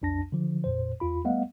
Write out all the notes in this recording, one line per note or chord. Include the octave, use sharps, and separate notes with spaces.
B1 F2 D4 A5 A#6
D3 F3
G1 F2 A#2 C5
E2 F4 B5
G3 A3 B3 D#5 F5 F#5